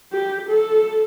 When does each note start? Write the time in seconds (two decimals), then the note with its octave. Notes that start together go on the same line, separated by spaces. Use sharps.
0.13 G4
0.49 A4